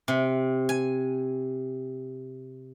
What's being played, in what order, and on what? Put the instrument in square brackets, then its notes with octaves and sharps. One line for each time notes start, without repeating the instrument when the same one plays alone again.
[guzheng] C3
G#5